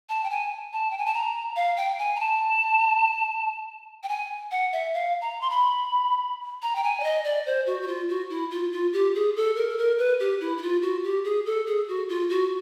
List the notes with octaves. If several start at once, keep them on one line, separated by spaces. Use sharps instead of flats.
A5
G5
G#5
A5
G5
G#5
A5
A#5
F5
G5
G#5
A#5
A5
G5
G#5
F#5
E5
F5
A#5
C6
B5
A#5
G5
G#5
D5
D#5
D5
C5
F#4
F#4
F4
F#4
E4
F4
F4
G4
G#4
A4
A#4
A4
A#4
B4
G4
E4
E4
F4
F#4
G4
G#4
A4
G#4
F#4
F4
F#4